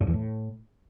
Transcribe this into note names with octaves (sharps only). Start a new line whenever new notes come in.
G2
E2
A2